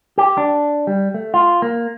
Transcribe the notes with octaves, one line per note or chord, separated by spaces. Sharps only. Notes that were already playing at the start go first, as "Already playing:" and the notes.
G4
D4
G3
A3
F4
A#3